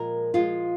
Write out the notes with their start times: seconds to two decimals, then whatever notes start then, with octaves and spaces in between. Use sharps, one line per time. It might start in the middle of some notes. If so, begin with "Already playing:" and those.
Already playing: A#2 F3 G#3 A#4
0.34 A#2 F3 G#3 F4